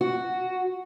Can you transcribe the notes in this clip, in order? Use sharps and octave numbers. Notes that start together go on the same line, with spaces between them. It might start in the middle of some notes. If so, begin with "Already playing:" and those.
F#4